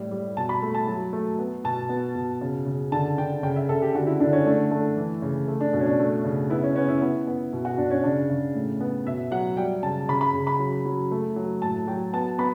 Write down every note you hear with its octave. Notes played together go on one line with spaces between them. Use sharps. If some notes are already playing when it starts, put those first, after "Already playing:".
Already playing: A2 G3
G3
B2 A5
B5
A3
A5
F#3
A3
B3
B2 A5
B3
B2
C#3
C#3
D3 A5
D3 G5
C#3 G5
E5
C#3 A4
G4
D3 F#4
E4
D3 D4
C#4
A3 D4
A3 D4
E3
C#3
A3
D4
B2
C#4
D4
A3
C#3
B3 E4
C#4
B3 C#4
E4
B3
B3
B2
F#4
B2 D4
C#4
C#3 D4
C#3
A2
B3
B2 E5
F#3 F#5
G3 G5
C#3 A5
C#3 B5
B5
C#3
B5
F#3
F#3
A3
F#3
A2 A5
F#3 G5
B3 A5
B3 B5